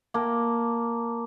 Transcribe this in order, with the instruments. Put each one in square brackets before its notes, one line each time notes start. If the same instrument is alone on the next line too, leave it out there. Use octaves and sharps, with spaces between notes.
[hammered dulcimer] A#3 A5